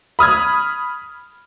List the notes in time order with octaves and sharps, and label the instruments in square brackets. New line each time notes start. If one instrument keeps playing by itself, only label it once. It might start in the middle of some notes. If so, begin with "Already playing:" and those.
[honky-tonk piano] B5 D#6 F6 G#6